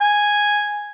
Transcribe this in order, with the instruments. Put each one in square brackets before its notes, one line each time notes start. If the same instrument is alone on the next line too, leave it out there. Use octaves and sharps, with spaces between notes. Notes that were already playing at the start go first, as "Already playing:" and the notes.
[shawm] G#5